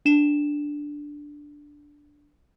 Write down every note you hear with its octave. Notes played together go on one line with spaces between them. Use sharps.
D4 E7